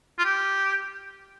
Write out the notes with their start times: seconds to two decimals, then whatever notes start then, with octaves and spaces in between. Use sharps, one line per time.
0.19 F4
0.25 G4